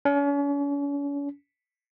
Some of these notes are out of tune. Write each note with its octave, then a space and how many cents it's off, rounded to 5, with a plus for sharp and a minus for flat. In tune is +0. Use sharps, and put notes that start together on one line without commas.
C#4 +40